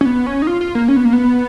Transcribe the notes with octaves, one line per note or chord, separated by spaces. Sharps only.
C#4
B3
C#4
D#4
F4
F4
A#3
C#4
B3
A#3
B3